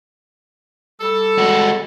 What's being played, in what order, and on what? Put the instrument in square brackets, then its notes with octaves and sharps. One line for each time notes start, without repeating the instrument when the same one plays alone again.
[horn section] G3 A4
[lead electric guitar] G#3 F#4